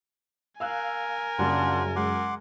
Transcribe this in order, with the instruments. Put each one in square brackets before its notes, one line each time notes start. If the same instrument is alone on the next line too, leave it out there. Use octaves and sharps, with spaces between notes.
[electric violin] A#4 G#5 [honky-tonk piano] F5 E6 F#6
[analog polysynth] F#2 C#3 [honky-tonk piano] G3 A#3 [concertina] D4 F4 F#5
[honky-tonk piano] G#3 [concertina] F#5 C6 D6